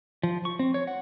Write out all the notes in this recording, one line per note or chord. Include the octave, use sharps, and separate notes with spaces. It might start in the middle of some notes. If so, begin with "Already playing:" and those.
F3
C#6
C4
C#5
F#5